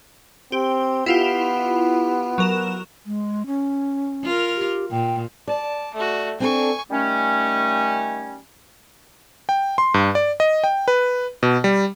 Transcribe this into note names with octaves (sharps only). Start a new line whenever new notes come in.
C4 G4
B3 E4 F4 G4
F#3 A#4 E7
G#3
C#4
F4 A#4
G4
A#2 G5
D5 A5
A3 F#4
C4 D4 A4 G#5 C#6
D#3 G3 A3 C#4
G5
C6
G2
D5
D#5
G5
B4
B2
G3